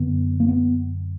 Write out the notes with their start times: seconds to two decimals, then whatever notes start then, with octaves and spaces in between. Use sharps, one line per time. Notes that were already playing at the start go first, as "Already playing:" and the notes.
Already playing: F#2 D3 B3
0.40 A#3
0.49 B3